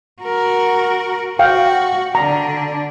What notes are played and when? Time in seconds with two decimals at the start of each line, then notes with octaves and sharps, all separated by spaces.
0.22 F#4 A#4
1.39 F#4 F5 G5
2.15 D3 D4 A#5